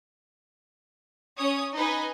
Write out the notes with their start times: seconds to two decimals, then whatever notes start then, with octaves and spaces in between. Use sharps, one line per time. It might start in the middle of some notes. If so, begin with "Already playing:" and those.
1.38 C#4 C#5 D#6
1.77 D#4 B4 G#5